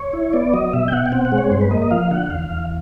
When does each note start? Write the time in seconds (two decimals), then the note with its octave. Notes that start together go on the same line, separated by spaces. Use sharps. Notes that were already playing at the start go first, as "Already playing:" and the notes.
Already playing: C#5
0.13 E4
0.33 B3 D5
0.53 F#3 D#5
0.73 B2 E5
0.88 G5
0.92 B2 F#5
1.06 G5
1.12 C4 F#5
1.25 F#5
1.32 G#3
1.38 C#5
1.51 G2 C5
1.61 B4
1.71 A#3 D#5
1.82 D#5
1.91 F3 F5
2.11 D3 F#5
2.26 F#5
2.30 E2 F5
2.50 E2